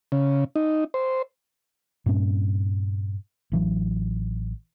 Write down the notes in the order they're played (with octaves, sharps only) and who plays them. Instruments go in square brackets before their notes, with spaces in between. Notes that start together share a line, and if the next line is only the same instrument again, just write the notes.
[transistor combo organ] C#3
D#4
C5
[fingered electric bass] G2 A#2 C4 C#4
A1 E3 F#3